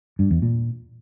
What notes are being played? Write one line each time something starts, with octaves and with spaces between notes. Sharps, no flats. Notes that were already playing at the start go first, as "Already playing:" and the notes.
G2
E2
A#2